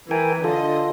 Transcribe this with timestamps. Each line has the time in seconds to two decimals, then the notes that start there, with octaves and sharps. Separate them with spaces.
0.11 E3 A#4 G5 G#5
0.44 D3 F4 A4 D#5